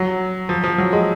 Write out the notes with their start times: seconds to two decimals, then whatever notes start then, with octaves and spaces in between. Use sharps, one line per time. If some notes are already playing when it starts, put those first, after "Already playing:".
Already playing: F#3
0.49 F3
0.64 F3
0.78 F#3
0.93 G#3